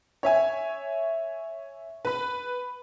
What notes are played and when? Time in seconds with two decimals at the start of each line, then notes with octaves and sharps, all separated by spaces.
0.23 C#5 E5 G#5
2.05 B4 B5